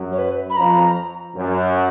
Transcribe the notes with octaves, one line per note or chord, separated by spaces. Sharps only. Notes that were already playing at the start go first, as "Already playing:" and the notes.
Already playing: F#2
C#5
B4
B5
F2 A#5
F#2
F#5